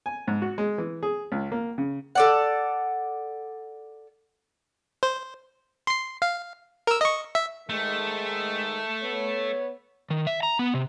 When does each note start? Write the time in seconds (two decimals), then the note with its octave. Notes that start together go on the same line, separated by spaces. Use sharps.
0.06 G#5
0.28 G#2
0.42 F#4
0.58 G#3
0.78 E3
1.03 G#4
1.32 C#2
1.52 A#3
1.78 C#3
2.15 A4 D5 F#5
5.03 C5
5.87 C6 C7
6.22 F5
6.87 A#4 E6
7.01 D#5 C#6
7.35 E5
7.69 G#2 D#3 G#3 A3
9.02 B3 C#5
10.10 D#3
10.27 E5
10.43 A#5
10.59 B3
10.74 C3